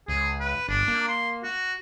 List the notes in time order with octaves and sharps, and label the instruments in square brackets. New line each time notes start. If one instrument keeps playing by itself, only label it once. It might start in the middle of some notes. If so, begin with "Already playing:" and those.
[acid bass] C#2 [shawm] G#4
[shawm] B4
[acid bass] G1 [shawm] D4
[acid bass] A#3
[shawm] C6
F#4